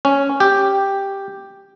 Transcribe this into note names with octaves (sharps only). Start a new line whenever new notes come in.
C#4
G4